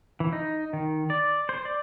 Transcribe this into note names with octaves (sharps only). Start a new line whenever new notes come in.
E3
D#4
D#3
D5
C5
D5